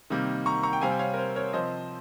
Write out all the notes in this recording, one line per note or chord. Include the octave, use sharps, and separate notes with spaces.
C3 D#3 G3 A#3
A#5 C#6
A#5 C#6
G5
C3 G3 C4 F5 G#5
G5
C#5 F5
A#4
C5
A#4 C#5
C3 F3 C4 C5 D#5